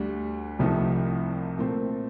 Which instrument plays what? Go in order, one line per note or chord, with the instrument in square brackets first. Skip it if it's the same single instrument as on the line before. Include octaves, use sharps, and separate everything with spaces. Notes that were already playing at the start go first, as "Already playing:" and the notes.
Already playing: [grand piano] D2 D3 G3
C2 C3 F3 A3 D#4
A#2 A3 C4